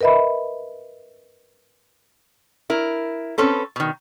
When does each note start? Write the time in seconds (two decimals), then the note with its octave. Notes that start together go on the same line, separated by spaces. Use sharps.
0.01 A#4 B4 D#5 E5 B5
2.70 E4 A#4
3.38 C4 C#4 A4 B4
3.76 B2 D#3